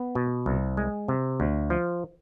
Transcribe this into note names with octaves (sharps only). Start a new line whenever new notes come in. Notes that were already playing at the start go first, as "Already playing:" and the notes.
Already playing: B3
B2
C2
G#3
C3
D2
F3